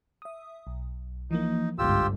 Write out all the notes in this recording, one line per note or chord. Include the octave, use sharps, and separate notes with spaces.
E5 D#6
B1
E3 F3 A#3 D#4
G1 C2 G#2 F4 G4 E6